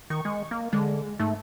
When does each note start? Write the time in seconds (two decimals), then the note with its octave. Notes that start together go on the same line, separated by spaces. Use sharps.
0.10 D#3 C#6
0.25 G#3
0.51 A#3
0.73 D3 G#3
1.19 G#2 A3